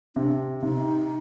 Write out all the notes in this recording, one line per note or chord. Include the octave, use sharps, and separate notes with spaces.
C3 D4
C3 D#4